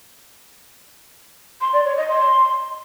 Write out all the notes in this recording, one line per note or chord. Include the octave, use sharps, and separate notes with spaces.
C6
D5
C#5
D#5
C6